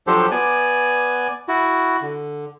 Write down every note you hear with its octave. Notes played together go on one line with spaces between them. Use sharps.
F3 F#3 D4 G4 A4 C5
B3 D5 G#5
E4 F#4
D3